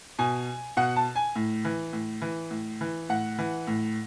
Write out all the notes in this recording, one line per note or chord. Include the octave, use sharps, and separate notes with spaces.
B2 G#5
B2 F#5
A5
G#5
A2
E3
A2
E3
A2
E3
A2 F#5
E3
A2